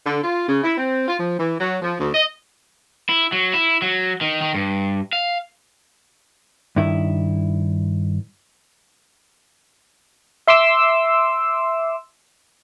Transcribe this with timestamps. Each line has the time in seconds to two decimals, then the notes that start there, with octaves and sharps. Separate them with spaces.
0.05 D3
0.24 F4
0.49 C#3
0.64 E4
0.77 C4
1.08 F4
1.20 F3
1.39 E3
1.60 F#3
1.82 F3
2.00 D2
2.15 D#5
3.09 E4
3.32 F#3
3.54 E4
3.82 F#3
4.21 D#3
4.42 D#3
4.55 G2
5.13 F5
6.76 G2 D#3 E4
10.47 E5 C6 D6 E6